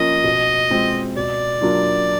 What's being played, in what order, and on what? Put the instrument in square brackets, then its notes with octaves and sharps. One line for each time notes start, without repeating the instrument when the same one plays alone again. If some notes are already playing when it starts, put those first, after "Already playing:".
Already playing: [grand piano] F3 A#3 C#4 F4 [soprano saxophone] D#5
[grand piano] B2
G#3 C4 F4
[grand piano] B2 [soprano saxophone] D5
[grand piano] F#3 A#3 D4 F4